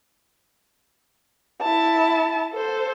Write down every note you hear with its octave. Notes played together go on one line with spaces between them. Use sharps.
E4 A5
A4 C5